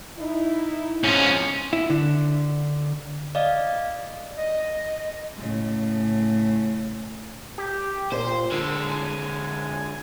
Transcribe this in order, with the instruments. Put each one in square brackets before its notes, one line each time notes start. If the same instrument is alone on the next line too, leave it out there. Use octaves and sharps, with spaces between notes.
[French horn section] D#4 E4
[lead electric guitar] G#2 F3 [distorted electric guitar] C#4
[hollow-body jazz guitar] E4
D3
[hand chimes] D5 D#5 F5
[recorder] D#5
[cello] A2 C#3
[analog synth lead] G4
[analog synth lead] A#2 [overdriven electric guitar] C5
[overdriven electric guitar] D3 G#3 [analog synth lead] E6
[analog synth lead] G#5